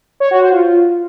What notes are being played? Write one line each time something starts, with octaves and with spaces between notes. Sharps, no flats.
C#5
F#4
C5
F4